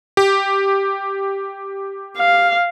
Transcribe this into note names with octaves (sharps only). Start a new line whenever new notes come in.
G4
F5